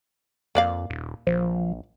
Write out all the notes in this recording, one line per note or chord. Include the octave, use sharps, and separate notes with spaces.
F2 A#3 D5 F5
D#1
A#1 F3